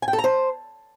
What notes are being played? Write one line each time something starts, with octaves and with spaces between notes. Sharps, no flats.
G#5
G5
A4
A#5
C5